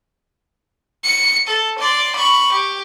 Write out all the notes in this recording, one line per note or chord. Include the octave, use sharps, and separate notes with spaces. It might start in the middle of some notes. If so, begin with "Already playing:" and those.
C#7
A4
D5 C6
B5 C#6
G4